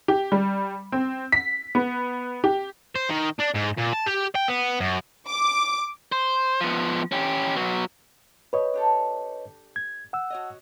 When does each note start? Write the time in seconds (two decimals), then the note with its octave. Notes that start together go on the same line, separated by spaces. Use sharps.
0.08 G4
0.32 G3
0.92 C4
1.32 B6
1.75 B3
2.44 G4
2.95 C5
3.10 D#3
3.40 D4
3.55 G#2
3.78 A#2
3.93 A5
4.06 G4
4.35 G5
4.48 B3
4.80 F#2
5.28 D6
6.12 C5
6.61 F3 B3
7.12 C#4 G4
7.56 F#3 B3
8.53 G4 B4 C#5 D#5
8.74 D4 G4 A4
9.76 G#6
10.13 F#5 E6
10.30 F#4 C#5 D#5